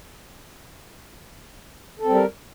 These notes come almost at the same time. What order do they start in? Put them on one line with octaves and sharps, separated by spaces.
A4 C4 G3 A#4